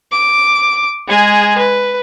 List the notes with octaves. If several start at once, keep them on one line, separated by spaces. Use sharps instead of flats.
D6
G#3 G#4
B4